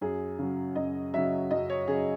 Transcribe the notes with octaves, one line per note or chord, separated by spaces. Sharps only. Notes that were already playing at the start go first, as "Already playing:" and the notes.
F#2 G#4
C#3 F#3
F#2 D#5
C#3 F#3 E5
F#2 D#5
C#5
C#3 F#3 G#4